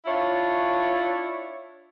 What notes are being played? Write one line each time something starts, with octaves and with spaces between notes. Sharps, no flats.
D4 E4 F4 C#5